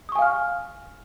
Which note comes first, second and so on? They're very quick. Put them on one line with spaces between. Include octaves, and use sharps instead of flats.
D#6 C#6 G#5 F5 F6